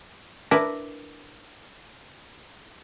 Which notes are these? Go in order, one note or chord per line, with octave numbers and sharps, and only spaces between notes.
D4 E4 A#4 B4 D5